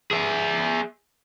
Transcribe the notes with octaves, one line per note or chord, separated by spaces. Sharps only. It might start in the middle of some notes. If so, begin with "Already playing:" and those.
G#4 E5